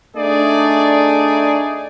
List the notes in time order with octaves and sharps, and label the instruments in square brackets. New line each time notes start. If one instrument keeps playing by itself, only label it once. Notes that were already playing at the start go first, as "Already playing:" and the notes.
[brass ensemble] A3 D4 D#4 G#4 D5